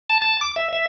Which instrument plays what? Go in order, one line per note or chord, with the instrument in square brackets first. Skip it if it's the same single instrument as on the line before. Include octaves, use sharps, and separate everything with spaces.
[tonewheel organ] A5
A5
D6
E5
E5